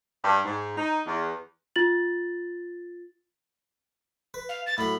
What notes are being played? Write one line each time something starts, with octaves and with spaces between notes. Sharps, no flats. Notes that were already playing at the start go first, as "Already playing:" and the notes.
G2
G#2
D#4
E2
F4 A6 F#7
B4
F5
A6
A2 F#3 B5